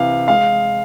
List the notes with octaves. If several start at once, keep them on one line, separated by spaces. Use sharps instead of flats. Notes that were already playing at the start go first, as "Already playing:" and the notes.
Already playing: C3 E3 F5
G#3 F5